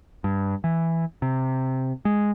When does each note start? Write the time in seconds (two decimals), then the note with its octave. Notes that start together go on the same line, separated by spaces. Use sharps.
0.24 G2
0.64 E3
1.22 C3
2.05 G#3